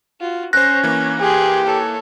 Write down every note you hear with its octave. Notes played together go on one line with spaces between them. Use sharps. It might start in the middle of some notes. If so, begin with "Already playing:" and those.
F4 F#4
C#4 C5 F#6 A#6
E3 A#3
G4 G#4 C6
A4 C#5